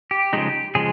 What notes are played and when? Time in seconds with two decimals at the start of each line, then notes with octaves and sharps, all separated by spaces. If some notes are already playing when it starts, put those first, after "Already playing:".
0.11 G4
0.33 C#3 F3 G#3 D#4
0.75 C#3 F3 G#3 G#4